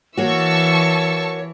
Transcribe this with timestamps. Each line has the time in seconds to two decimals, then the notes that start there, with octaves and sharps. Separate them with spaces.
0.17 E3 A#3 F#4 C#5 A5 C#6 E6